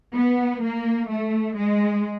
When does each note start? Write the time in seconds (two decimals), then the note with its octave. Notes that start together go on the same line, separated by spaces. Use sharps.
0.15 B3
0.62 A#3
1.08 A3
1.55 G#3